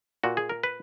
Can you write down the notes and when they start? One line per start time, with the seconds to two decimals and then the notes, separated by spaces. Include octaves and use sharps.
0.23 A#2 F#4
0.37 G#4
0.49 A#4
0.63 B4